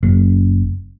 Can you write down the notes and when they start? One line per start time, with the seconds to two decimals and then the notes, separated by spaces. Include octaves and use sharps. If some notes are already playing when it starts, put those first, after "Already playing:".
0.03 F#1